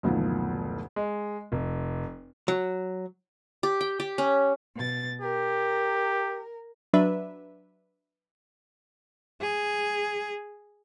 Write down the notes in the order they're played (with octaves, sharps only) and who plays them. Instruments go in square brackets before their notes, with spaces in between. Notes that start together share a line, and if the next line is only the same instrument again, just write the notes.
[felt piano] F#1 D2 B2 D#3 F3
[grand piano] G#3
F1
[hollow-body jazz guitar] F#3
[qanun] G4
G5
G4
C#4
[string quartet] B2 A6
[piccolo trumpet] G4 [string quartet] A#4
[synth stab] F#3 D4 B4 E5
[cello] G#4